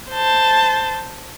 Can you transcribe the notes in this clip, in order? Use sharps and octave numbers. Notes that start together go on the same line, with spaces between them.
C5 A5